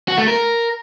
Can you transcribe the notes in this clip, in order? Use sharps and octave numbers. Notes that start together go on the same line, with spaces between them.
F#4
A3
A#4